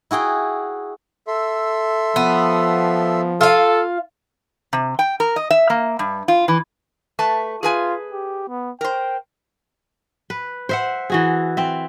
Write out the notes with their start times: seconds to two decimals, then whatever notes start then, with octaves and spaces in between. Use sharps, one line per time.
0.11 E4 F#4 G#4 G5
1.27 A4 E5 C6
2.16 F3 B3
3.41 F4 A4 F5
4.73 C3
4.99 G5
5.20 A#4
5.36 D#5
5.50 E5
5.70 A#3
5.99 G2
6.28 F4
6.48 E3
7.19 A3 B4 A5
7.63 F4 G#4 B4 G#5
8.12 G4
8.49 B3
8.81 A#4 C5 G5
10.30 B4
10.69 C5 E5 F#5
11.10 E3 F#4 G#4
11.57 C4 E5